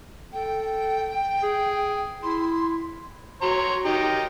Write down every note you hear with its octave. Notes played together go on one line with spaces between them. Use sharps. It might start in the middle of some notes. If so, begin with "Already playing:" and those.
A4 G5
G#4
E4 C6
F#4 C#5 A#5 C6
D#3 D#4 G4